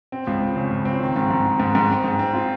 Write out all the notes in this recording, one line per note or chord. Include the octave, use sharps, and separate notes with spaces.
C4
C#2
C4
C#3
C#2
C4
D#3
G#2
G#2
D#3
G#2
G#2
C4
G#2
C4
F4